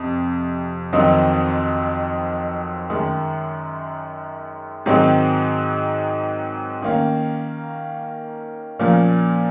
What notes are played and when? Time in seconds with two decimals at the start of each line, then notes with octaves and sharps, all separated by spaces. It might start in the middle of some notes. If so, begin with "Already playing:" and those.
Already playing: F2 C3
0.93 F2 D#3 F#3 C4 D#4
2.90 F#2 D#3 G#3
4.86 G#2 D#3 F#3 C4 D#4
6.82 D#3 A#3 C#4
8.79 A#2 F3 A#3 C#4